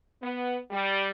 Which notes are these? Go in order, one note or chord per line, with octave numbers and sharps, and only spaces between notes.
B3
G3